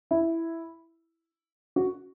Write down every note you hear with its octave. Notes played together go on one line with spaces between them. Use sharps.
E4
F#4